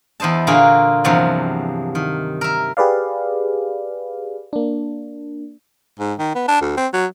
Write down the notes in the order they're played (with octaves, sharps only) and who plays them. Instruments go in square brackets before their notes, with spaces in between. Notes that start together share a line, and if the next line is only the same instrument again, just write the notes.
[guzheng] E2 E4 C5 D#5 A5
A#2 D3 A#3 F4 F#4 G#4
E2 G2 C3 F3 F#3
D#3
A#4 E5
[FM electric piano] G4 G#4 B4 D5 F5
A#3 D4
[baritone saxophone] G#2
D#3
B3
D4
D2
C4
F#3